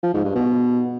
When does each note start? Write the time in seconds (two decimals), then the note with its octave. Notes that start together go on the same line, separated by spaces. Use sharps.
0.03 F3
0.14 G#2
0.25 G2
0.35 B2